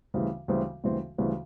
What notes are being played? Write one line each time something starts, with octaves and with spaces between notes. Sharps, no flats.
D2 C#3 E3 G3 C4
D2 C#3 E3 G3 C4
D2 C#3 E3 G3 C4
D2 C#3 E3 G3 C4